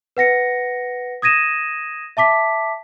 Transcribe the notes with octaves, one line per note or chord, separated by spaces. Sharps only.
B4 F#5 A#6 C#7
D#6 G#6 A#6 D#7 E7
E5 A5 D6 B6